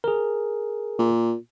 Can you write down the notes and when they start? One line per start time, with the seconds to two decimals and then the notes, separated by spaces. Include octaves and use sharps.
0.04 G#4 A#4
0.99 A#2